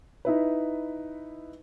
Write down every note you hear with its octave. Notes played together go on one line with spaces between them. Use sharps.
D#4 E4 B4